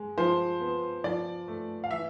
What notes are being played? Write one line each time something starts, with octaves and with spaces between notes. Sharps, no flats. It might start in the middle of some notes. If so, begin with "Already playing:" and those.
Already playing: G#3
F3 C5
B3
F3 D5
A3
F5
E3 E5